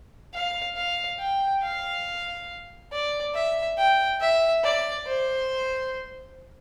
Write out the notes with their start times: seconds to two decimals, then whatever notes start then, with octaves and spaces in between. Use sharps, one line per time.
0.34 F5
0.77 F5
1.20 G5
1.63 F5
2.92 D5
3.35 E5
3.78 G5
4.21 E5
4.63 D5
5.07 C5